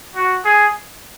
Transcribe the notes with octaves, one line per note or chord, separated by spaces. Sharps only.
F#4
G#4